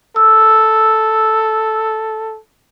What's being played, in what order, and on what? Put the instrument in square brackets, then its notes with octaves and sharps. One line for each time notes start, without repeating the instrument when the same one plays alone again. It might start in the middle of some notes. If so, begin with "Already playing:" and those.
[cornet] A4 [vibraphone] E6